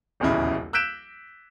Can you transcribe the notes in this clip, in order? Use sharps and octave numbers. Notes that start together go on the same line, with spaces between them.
D#1 B1 E2 C#3 E4
E6 F#6 G6 B6 D7 E7